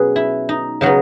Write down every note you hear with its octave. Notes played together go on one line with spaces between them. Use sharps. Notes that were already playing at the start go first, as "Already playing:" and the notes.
Already playing: B2 F#3 B3 C#4 G#4 B4
E4
D#4
C#3 F#3 B3 D#4